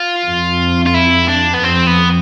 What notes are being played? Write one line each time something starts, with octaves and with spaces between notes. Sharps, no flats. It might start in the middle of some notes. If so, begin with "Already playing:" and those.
Already playing: F4
F2
F4
E4
D4
B3
F2 C4
B3